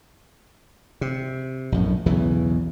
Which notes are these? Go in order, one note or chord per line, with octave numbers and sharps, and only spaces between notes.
C3
A#1 F#2 A2
B1 E2 C#3 E3